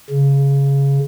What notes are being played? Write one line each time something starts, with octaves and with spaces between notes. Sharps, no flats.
C#3